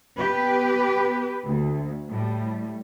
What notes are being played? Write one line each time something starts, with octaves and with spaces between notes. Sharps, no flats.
B3 G4 B4
D2
A2 G3